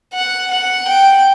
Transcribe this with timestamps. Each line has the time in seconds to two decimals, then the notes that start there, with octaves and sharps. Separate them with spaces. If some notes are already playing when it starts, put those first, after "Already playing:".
0.13 F#5
0.50 F#5
0.87 G5